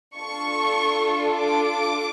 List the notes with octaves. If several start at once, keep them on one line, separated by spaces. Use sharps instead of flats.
D4 F4 A4 C#6
D6